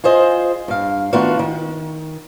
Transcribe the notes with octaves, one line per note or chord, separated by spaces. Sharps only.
F4 G#4 C5 D#5
G2 F5
D#3 A3 B3 D4 F4 F#4
D#3